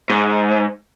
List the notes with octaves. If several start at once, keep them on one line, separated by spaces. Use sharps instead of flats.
G#2